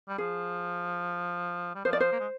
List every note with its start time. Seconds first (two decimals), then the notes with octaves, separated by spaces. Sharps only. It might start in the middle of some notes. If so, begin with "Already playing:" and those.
0.08 G3
0.18 F3 G#4
1.75 G3
1.85 F3 C5
1.93 D5
2.00 C5
2.12 A#3
2.20 G#3